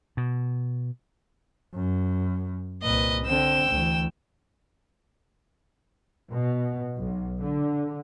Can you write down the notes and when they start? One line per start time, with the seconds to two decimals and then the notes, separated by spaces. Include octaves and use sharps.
0.17 B2
1.74 F#2
2.83 C2 A#2 B4 D#5
3.26 D3 C4 G5 E6
3.70 D2 E3
6.29 B2
6.98 B1
7.42 D3